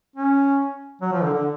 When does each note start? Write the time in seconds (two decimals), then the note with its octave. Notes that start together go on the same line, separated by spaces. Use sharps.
0.16 C#4
1.01 F#3
1.12 F3
1.23 D3
1.34 D3